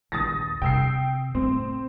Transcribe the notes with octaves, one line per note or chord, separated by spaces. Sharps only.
A#1 D#2 D#6 A6 A#6
C3 G5 E6 C7
A2 C4